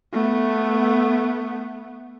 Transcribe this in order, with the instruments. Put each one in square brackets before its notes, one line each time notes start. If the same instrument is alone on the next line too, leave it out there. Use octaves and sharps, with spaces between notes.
[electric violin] A3 B3